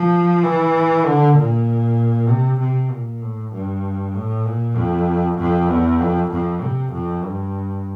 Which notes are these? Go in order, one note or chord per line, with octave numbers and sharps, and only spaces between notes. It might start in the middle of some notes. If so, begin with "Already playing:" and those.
Already playing: F3
E3
D3
A#2
C3
C3
A#2
A2
G2
A2
A#2
F2
F2
E2
F2
F2
C3
F2
G2